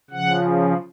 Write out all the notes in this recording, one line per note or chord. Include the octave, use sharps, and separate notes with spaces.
C#3 F3 F#5